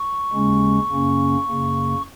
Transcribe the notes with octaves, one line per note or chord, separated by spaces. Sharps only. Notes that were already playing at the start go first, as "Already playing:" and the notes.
Already playing: C#6
D#2 C#3 G#3 C#4
F#2 C#3 A#3 C#4
F#2 C#3 A#3